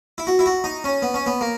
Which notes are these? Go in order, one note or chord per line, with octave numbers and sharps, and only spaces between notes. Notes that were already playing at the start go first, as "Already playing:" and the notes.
E4
F#4
E4
F#4
D#4
C#4
B3
C#4
B3
A#3